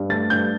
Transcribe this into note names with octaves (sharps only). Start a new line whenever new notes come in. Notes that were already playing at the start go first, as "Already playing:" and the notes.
Already playing: G2
A3 A6
G2 G6